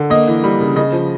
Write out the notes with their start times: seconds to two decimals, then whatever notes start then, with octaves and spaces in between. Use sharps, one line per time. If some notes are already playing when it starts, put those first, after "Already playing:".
Already playing: D3
0.10 A#3 D#5
0.27 E3
0.44 G3
0.60 C#3
0.76 C#3 D#5
0.92 F3